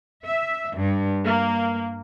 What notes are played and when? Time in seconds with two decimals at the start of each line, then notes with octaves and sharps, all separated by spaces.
0.25 E5
0.76 G2
1.23 A#3